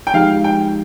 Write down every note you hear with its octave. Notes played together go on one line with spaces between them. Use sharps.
G5
F3 G#3 D#4 G4 F5
G5